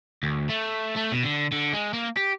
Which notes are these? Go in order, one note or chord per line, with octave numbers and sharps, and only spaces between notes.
D2
A3
A3
B2
D3
D3
G#3
A#3
G4